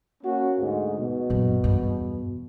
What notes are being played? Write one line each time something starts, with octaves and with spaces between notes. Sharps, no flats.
A#3 C#4 F#4
D2 G#2
B2
A#1 F#2
E2 G2